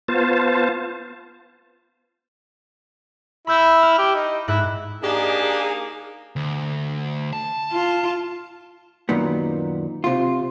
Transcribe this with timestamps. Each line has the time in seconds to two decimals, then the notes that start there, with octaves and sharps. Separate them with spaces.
0.08 B3 F4 C5 A5
3.47 E4 B5 E6 G6
3.83 F6
3.99 G4
4.15 D#4
4.48 G#2 E4 F#6
5.03 A#3 D4 D#4 G4 G#4 D5
6.36 D2
7.33 A5
7.72 F4
9.09 F#2 A#2 D#3 B3
10.04 C3 F4